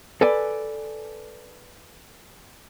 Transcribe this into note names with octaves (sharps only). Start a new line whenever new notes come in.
A4 B4 D5 G#5